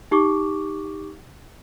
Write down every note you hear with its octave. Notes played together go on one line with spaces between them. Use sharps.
D#4 G4 C#6 D6